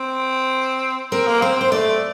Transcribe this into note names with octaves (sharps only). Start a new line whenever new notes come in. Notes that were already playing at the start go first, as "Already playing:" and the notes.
Already playing: C4
C4 A#4
A#3
C4 C5
C4 C5
A3 D5